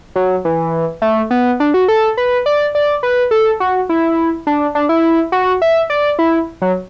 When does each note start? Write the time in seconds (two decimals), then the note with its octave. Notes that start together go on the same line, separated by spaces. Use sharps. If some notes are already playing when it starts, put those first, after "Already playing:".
0.16 F#3
0.45 E3
1.02 A3
1.31 B3
1.60 D4
1.74 F#4
1.88 A4
2.17 B4
2.46 D5
2.75 D5
3.03 B4
3.31 A4
3.60 F#4
3.89 E4
4.47 D4
4.75 D4
4.89 E4
5.32 F#4
5.62 E5
5.90 D5
6.19 E4
6.62 F#3